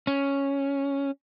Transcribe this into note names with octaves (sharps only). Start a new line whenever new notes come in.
C#4